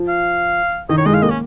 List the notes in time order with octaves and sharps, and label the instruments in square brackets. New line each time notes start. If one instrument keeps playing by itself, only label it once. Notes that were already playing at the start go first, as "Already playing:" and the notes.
Already playing: [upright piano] F3
[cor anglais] F5
[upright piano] D#3 [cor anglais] D#5
[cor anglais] C#5
[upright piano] G#3 [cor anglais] D#5
[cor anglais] F5
[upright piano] A#3 [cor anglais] D#5
[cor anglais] C#4